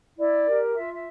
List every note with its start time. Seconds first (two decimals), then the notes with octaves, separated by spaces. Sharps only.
0.17 E4 D5
0.46 G4 A#4
0.74 F4 E5
0.94 E5